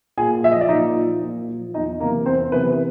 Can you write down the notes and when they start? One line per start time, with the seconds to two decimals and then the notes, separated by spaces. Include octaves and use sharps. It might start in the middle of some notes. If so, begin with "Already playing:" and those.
0.17 A#2 G#4 G#5
0.43 F3 E5
0.52 D#5
0.61 D5
0.69 A#2 D#4 D#5
0.96 F3
1.22 A#2
1.49 F3
1.74 E2 D#4 D#5
2.00 C3 A#3 A#4
2.04 E3
2.26 E2 C4 C5
2.52 C3 E3 B3 B4